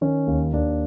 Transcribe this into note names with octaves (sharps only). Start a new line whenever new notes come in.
D#3 C#4
D#2
D#2 D4